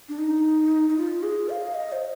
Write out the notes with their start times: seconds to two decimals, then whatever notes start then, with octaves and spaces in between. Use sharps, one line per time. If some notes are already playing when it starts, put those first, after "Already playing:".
0.09 D4
0.18 D#4
0.89 D#4
0.97 F4
1.23 G#4
1.49 F5
1.74 D#5
1.92 C5